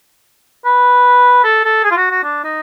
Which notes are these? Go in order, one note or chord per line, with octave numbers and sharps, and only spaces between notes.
B4
A4
A4
G#4
F4
F#4
F#4
D4
D#4